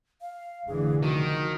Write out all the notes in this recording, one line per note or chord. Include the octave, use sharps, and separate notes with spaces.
F5
F1 D3 E3 G#4
D#3 F3 F#4